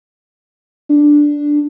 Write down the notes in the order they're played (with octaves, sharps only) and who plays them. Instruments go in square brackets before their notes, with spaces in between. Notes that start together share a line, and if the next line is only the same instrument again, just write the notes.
[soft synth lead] D4